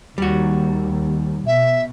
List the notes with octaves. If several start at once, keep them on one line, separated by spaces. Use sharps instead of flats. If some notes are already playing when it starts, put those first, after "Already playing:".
D#2 G3 F#4
B2 E5